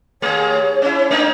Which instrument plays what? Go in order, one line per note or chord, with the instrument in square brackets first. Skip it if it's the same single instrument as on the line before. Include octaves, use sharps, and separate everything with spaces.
[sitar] D#2 A3 G#4 [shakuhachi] C#5
[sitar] C#4 E4
A3 D4 D#4